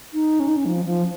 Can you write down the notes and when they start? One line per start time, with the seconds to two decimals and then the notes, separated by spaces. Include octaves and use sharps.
0.14 D#4
0.40 C#4
0.48 D#4
0.57 C#4
0.66 F3
0.86 F3